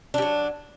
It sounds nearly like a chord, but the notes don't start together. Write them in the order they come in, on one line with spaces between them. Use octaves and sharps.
D4 G3 F#3